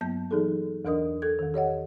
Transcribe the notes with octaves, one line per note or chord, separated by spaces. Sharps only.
G2 F#3 A#3 B3 A5 G6
E3 F#3 D#4 G#4 A4
E2 E3 D4 A#4 D#5 D#6
A4 G#6
E2 D#3
G4 C#5 D#5 F#5